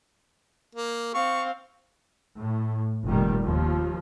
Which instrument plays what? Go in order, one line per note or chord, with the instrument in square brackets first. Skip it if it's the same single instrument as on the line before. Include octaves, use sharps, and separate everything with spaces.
[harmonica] A#3
[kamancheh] C4 F5 [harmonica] C#6
[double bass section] A2
F1 A#2 D#3 G3
D#2 F3